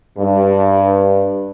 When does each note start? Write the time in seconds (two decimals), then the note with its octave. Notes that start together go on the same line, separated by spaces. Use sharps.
0.18 G2